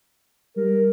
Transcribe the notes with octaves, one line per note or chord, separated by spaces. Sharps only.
G3 A#4